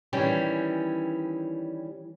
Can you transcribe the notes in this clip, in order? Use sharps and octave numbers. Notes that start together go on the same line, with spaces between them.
D#3 E3 G3 C#4